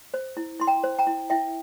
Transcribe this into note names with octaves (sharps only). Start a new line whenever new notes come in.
C5
E4
E4 C6
G5 A#5
C5
G5 A#5
E4
E4 E5 G5